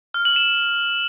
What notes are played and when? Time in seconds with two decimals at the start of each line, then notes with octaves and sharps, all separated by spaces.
0.14 F6
0.25 F#7
0.36 E7